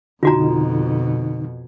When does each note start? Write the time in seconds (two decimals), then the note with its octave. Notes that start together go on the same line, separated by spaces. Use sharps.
0.23 F2 B2 D3 D#4 F4 F#4 A#5